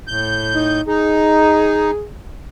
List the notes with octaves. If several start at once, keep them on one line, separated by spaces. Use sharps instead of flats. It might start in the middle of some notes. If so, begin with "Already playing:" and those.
A2 G6
D#4
D#4 G#4